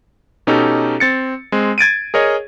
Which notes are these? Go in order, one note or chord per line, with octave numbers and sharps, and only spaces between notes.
B2 C#4 D#4 G4 A4
C4 A6 C#7
G#3 C4
G#6 A6 D7 D#7
G#4 A#4 C#5 D#5